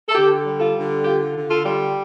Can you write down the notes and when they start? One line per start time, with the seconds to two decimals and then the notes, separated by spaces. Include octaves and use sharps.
0.09 A4
0.15 D3 G4
0.46 G3
0.60 F4 A4
0.75 D3
1.05 F4 G4
1.35 D3
1.50 F4 A4
1.65 G3